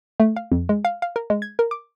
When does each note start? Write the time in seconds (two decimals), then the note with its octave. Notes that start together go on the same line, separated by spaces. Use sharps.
0.20 A3
0.36 F5
0.52 F2
0.69 G#3
0.85 F5
1.02 F5
1.16 A#4
1.30 G#3
1.42 G#6
1.59 A#4
1.71 D6